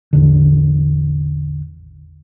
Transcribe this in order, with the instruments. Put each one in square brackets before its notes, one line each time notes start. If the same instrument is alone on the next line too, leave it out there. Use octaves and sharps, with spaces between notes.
[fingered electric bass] A1 E2 D3